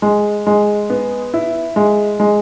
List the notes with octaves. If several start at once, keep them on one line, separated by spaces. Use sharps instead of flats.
G#3
G#3
B3
E4
G#3
G#3